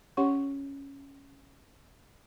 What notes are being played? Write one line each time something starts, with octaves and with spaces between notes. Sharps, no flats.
C#4 G4 C#5 F#5 C6 C#6